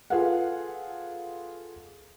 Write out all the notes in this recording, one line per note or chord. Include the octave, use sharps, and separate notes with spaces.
F4 G#4 A4 B4 F5 F#5